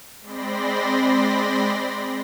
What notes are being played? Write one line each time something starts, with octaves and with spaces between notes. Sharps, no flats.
G#3 C4 D5 B5 C6 A#6